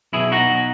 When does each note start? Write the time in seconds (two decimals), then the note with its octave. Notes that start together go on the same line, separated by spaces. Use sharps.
0.13 B1 B2 F#3 E4 G#4
0.32 D#4 F#4
0.50 B2 F#3